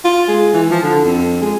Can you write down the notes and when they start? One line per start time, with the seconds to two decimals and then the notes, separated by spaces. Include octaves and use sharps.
0.05 F4
0.28 G#3
0.54 E3
0.71 F3
0.83 D3
1.05 F2
1.42 G#3